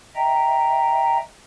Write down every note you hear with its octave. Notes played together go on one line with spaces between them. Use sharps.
D#5 E5 G5 A#5